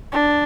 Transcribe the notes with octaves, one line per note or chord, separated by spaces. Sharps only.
D4